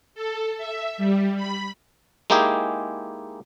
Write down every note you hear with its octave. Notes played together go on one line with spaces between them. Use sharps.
A4
E5
G3
B5
G#3 A#3 D#4 E4 G4 G#4